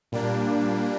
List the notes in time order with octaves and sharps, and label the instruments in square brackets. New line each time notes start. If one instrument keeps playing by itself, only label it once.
[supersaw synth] A#2 G3 A#3 D4